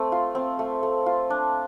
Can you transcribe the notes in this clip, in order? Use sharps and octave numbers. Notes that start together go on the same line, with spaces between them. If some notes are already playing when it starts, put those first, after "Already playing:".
Already playing: A3 C4
F4
C4
A3
A3
F4
D4